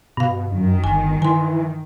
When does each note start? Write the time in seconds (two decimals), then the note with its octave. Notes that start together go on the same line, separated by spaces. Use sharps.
0.17 G2 B2 F5
0.51 F#2 D#3
0.84 G1 G#5
1.22 E3 G#5 C6